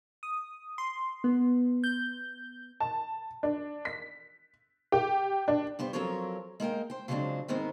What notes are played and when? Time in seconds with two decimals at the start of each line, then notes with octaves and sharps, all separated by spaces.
0.23 D#6
0.78 C6
1.24 B3
1.84 G6
2.80 A5
3.43 D4
3.85 B6
4.92 G4
5.48 D4
5.79 G2 B3 G4 C5
5.93 F3 F#3 C4 A4 A#4 C#5
6.60 G#3 A#3 A#4 G5
6.90 C5 G5
7.08 C#3 F3 F#3 G#3 C4 D4
7.48 G#2 D#3 G#3 B3 C4